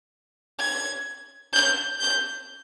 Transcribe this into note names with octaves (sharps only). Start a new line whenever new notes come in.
G#6
G6
G6